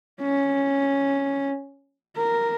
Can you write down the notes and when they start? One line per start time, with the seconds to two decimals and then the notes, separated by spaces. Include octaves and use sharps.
0.20 C#4
2.16 A#4